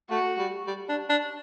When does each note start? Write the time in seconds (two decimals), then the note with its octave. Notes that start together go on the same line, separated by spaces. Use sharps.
0.10 A3 F#4
0.39 G3
0.67 G3
0.89 D4
1.10 D4